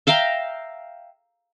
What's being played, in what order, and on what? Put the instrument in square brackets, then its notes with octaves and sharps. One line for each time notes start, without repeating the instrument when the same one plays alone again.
[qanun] E5 F5 G5 A#5